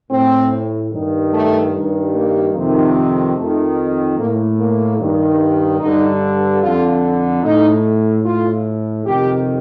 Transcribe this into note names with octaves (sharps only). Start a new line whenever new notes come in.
A2 C4
G2 D#3
A3
G2 D#3
A#3
F2 C3 D#3
F2 D#3 A3
A2 A#3
A#3
G2 D#3
G2 D3 D#4
F2 D3 F4
A2 D#4
A2 F4
F2 C3 D#3 G4